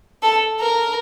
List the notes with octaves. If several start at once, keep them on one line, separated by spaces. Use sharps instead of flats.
A4
A#4